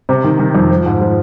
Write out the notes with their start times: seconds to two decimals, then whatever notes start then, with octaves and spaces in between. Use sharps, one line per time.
0.09 C3
0.24 D#3
0.39 D#3
0.55 F2
0.71 F3
0.86 G#2
1.01 F3